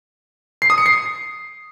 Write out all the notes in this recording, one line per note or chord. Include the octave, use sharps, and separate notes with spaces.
C7
D#6
C#7
C7